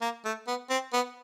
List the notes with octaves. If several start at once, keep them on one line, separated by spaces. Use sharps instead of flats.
A#3
A3
B3
C4
B3